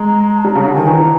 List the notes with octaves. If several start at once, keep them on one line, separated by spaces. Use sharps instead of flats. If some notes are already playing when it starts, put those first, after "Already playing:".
Already playing: G#3 A#5
A5
G3 A#5
C#3 A5
D3
D#3 G#5
E3 A#5